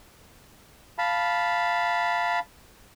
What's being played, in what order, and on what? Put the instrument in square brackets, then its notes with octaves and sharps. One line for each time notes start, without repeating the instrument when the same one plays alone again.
[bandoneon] F5 A5 B5